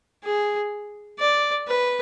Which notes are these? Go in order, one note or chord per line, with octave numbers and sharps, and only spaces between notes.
G#4
D5
B4